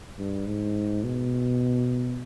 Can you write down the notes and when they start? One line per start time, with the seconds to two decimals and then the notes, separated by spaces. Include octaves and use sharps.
0.19 G2
0.47 G#2
1.04 B2